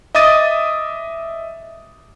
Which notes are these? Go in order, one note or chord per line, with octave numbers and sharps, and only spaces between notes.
D#5 E5 D6 D#6 A6 D#7